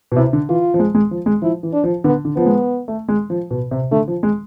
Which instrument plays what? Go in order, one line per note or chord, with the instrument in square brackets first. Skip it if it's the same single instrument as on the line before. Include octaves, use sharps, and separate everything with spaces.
[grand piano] B2
[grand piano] C3 [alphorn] E4
[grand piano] D3
[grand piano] E3 [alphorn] F4
[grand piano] F3
G#3
G#3
F3
G#3
[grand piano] F3 [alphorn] E4
[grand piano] E3
[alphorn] D4
[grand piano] F3
[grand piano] D3 [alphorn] B3
[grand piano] D3
[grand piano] F3 [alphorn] B3
[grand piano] G#3
A3
G#3
F3
B2
C3
[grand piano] D3 [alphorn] A3
[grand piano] F3
G#3